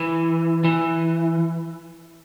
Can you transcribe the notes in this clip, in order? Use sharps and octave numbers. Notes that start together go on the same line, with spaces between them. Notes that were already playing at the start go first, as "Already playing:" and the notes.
Already playing: E3
E3